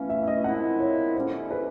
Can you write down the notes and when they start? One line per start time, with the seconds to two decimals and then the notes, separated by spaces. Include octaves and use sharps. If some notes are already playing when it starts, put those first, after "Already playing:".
Already playing: E3 A3 C#4 F5
0.09 E5
0.23 E5
0.27 D#5
0.44 A#2 F3 G#3 C4 E4 F#5
0.80 C#5
1.15 D3 G3 A#3 C#4 E4 C5
1.51 B4